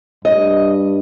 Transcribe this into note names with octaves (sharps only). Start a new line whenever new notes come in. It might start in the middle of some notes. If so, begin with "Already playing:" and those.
G2 D#5